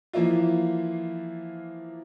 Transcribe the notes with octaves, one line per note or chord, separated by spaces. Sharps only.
E3 F3 A#3 E4 F4